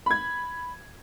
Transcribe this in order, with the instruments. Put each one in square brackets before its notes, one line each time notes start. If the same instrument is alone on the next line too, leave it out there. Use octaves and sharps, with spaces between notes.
[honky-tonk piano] B5 G#6